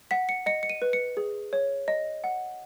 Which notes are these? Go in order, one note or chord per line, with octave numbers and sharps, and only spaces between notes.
F#5 B6
C#7
D#5 C#7
C#7
D#7
B4
C#7
G#4
C#5
D#5
F#5